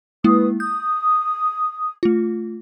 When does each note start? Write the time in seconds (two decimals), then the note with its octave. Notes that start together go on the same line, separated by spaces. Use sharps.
0.24 G#3 A#3 E4 B4 D#6
0.60 D#6 G6
2.03 A3 F4